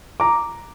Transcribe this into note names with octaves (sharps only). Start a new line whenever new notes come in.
A#5 D6